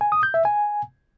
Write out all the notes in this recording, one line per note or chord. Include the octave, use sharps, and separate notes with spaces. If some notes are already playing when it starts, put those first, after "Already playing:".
G#5
D#6
G6
E5
G#5